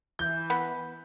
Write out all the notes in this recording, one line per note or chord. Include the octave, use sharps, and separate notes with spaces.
E3 G6
B3 B5